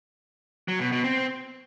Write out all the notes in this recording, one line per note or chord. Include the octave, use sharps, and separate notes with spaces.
F#3
B2
B2
C4